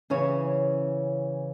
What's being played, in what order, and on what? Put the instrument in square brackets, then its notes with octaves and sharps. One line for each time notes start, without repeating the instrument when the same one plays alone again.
[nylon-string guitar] C#3 E3 C#4 E4 C#5